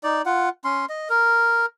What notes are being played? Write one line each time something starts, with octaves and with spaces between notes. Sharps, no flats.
D#4 D5
F4 F#5
C#4 C6
D#5
A#4